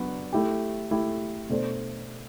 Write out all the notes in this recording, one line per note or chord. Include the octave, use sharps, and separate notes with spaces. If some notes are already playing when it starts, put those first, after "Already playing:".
Already playing: F#3 B3 D4 F#4
A3 E4 G4
A3 E4 G4
B2 A3 D4 A4 C5